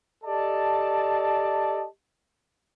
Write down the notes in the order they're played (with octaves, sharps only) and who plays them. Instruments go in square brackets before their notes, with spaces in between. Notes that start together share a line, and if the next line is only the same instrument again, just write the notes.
[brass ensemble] G4 A4 D5 D#5 A5